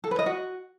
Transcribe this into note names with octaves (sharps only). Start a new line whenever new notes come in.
A4
B4
D#5
F#4